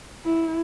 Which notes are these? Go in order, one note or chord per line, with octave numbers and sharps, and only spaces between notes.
E4